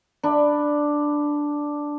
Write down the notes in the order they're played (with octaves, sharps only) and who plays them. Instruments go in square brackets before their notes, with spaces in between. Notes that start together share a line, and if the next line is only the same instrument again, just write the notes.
[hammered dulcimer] D4 B5